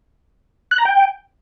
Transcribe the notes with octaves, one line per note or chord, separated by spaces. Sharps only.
F#6
A#5
G5